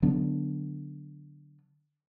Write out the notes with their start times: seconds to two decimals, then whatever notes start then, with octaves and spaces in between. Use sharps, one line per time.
0.02 D3 F#3 B3 D4